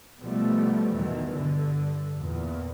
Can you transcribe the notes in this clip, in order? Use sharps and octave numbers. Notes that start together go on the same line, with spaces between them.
B2 F3 G3 A3 B3
E2 B2 D#3 E3
G2 D3
E2 A#2